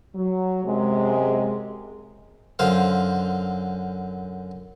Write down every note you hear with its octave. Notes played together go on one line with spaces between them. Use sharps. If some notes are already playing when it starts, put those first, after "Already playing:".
F#3
F#2 C3 G#3
F#2 D3 C5 F5